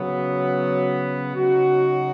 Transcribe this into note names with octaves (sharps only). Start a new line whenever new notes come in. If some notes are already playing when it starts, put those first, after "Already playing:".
Already playing: C#3 F#3 B3
C#3 F#3 D#4 F#4